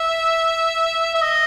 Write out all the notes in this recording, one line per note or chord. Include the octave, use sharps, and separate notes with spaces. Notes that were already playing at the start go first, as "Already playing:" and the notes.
Already playing: E5
E5
D#5